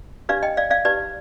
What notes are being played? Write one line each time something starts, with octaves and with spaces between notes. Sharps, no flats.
D4 G4 B4 D5 F5
D#5 G5
D5 F5
D5 F5
D#4 G4 B4 D5